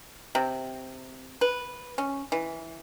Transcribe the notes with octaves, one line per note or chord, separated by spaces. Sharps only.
C3
B4
C#4
E3